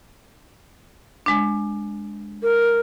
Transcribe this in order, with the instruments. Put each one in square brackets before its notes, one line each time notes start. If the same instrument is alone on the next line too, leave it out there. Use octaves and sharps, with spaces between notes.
[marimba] G#3 D4
[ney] A#4